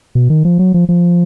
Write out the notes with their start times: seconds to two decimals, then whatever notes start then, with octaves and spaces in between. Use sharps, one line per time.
0.15 B2
0.30 D#3
0.45 F3
0.59 F#3
0.74 F3
0.89 F3